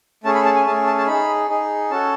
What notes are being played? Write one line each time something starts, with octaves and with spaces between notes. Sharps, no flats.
A3 C#4 G#4 A5
B5
A5
G#5
A3 C#4 G#4 A5
A5
A5
D#4 G#4 B5
D#4 G#4
C#4 F#4 A4 A5